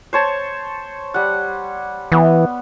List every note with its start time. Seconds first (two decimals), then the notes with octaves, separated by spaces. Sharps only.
0.13 C5 C#5 A5
1.14 G3 F#5
2.12 E3 B3